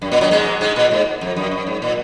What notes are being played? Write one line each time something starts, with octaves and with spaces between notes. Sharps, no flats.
F#2
A#2
F#2 F#3
G#2 G#3
G#2 G#3
A#2
G#2
F2
F#2
F#2
G#2
A#2